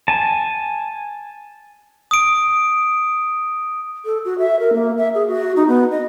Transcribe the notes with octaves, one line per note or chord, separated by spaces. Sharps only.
G#5 A5
D#6 D7
A4
F#4
E5
A#4
A#3
E5
G#4
F#4
D#4
B3
D#5